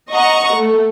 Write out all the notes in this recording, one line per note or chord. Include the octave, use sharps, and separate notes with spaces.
D#5 F#5 A#5 C#6
A3